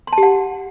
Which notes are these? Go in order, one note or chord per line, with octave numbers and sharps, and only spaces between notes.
C6
A5
G4
F#5